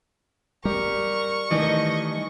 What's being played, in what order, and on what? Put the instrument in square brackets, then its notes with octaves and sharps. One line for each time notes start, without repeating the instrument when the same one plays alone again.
[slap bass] G3 [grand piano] G4 [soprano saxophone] A#4 [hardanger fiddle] C#6
[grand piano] D#3 E3 A3 [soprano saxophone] D#5